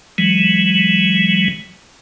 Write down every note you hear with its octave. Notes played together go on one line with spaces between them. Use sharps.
E3 F#3 G#3